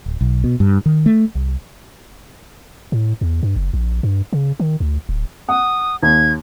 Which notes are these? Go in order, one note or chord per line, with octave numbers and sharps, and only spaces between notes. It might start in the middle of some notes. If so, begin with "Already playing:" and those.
D1
B1
B2
G2
D#3
A3
C2
A2
E2
G2
F#1
A#1
G2
C#3
D#3
D2
D1
F#5 D#6
D#2 G#6